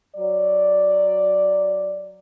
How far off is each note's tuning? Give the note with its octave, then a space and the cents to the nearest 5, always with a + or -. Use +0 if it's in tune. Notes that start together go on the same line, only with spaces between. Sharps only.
F#3 +0 D5 +0